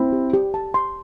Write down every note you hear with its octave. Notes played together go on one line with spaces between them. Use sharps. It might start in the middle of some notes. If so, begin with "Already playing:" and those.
Already playing: C4 E4 B5
G4
G4
A5
C6